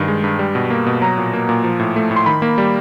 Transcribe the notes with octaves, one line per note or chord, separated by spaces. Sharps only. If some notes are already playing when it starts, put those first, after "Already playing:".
Already playing: G2 D#3
G#3
G2
G3
B2
A#3
B2
F#3 A#5
A#2
A#3
A#2
F3
A2
A3
A2
C6
D#3 B5
A#3
G3